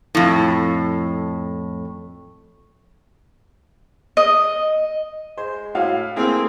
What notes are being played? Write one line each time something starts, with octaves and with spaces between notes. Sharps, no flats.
F2 A2
D#5
G#3 C5
A2 F#4 F5
A3 A#3 C4 E4 G#4